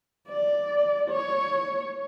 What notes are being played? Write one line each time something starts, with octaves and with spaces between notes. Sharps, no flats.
D5
C#5